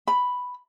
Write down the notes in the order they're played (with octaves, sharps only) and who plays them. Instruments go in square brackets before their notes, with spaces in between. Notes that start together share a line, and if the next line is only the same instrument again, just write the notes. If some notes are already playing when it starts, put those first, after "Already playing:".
[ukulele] B5